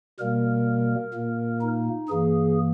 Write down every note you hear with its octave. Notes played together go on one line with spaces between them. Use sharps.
B2 G3 A#3 A#4
A#2 A#3
D#4
G2 E3 A#3 G#4